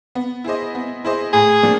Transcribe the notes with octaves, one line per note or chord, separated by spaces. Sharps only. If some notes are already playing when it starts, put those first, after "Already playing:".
B3
E4 G#4 C5 D#5
B3
E4 G#4 C5 D#5
A2 G#4
F3 A#3 D4